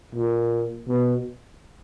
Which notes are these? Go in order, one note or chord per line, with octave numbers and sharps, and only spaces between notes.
A#2
B2